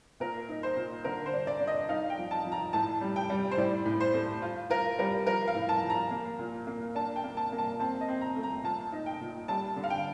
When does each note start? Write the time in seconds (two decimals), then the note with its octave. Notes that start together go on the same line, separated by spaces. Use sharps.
0.20 A#2 A#4
0.49 D#4
0.63 C5
0.76 A#2
1.04 D3 A#4
1.26 C5
1.33 D4
1.47 D5
1.60 D4
1.67 D#5
1.89 D#4 F5
2.10 G5
2.18 F3
2.31 A5
2.45 F3
2.52 A#5
2.73 A2 A5
3.01 G3
3.16 G5
3.30 G3
3.51 C5
3.57 A2 D5
3.85 A2
4.00 C5
4.14 A3
4.42 F4
4.70 F4 A#4
4.99 G3 A#4
5.27 F3 A#4
5.48 F5
5.55 A2
5.69 A5
5.82 F3
5.90 A#5
6.11 A#3
6.39 A#2
6.67 A#3
6.95 D4 A5
7.16 G5
7.24 A#3
7.37 A5
7.52 A#3
7.58 A5
7.79 C4 A5
8.01 D#5
8.08 C4
8.21 A#5
8.36 A3
8.43 A#5
8.63 A#2 A5
8.92 D#4
9.06 G5
9.21 A#2
9.48 G3 A5
9.76 D3
9.84 F5
9.90 G5